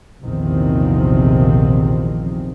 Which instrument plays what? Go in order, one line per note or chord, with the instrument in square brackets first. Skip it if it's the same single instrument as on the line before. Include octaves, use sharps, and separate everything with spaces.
[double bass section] A#1 E2 C3 D#3 F3 C4